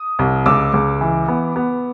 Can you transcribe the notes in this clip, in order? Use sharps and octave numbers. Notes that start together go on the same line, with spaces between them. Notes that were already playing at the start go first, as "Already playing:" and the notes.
Already playing: D#6
C2
C#2 D6 E6
C#2
E3
B3
B3